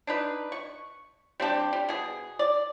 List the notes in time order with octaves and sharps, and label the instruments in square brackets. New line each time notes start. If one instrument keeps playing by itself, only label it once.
[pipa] D4 D#4 B4
C#6
G3 C4 D4 G4
G3
B2 G#4
D5